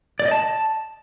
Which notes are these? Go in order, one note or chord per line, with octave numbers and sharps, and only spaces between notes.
D5
D#5
A5